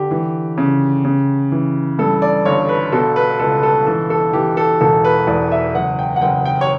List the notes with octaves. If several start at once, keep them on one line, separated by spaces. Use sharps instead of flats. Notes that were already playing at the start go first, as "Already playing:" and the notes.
Already playing: D3 G4
E3
C#3
C#3
E3
G2 A4
D5
G1 C#5
B4
B2 A4
B4
C#2 A4
A4
E3 A4
A4
E3 G4
A4
E1 A4
B4
E2 D5
E5
F#1 F#5
G5
F#5
F#1 G5
G5
C#5